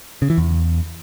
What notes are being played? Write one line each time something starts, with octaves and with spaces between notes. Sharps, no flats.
C#3
E3
E2